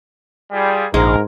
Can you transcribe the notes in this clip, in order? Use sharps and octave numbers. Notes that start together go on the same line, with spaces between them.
G3 F4 G#4
A#1 G#2 G#3 A#4